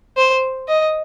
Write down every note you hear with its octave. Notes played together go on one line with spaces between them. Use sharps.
C5
D#5